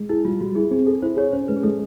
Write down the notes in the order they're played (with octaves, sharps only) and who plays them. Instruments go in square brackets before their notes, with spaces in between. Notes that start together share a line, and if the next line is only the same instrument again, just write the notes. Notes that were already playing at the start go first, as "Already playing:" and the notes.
Already playing: [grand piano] G#3
[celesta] E4 [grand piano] G#4
[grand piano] G3 [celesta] F4
[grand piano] G3 [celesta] F#4
[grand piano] E4 [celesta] G#4
[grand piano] C4 [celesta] G#4
[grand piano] G#4 [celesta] A4
[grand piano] E4 [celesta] C5
[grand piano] G#4 [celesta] C#5
[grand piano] C#4 [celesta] C5
[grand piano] G#3 [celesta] B4
[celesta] G#4
[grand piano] G#3 [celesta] A4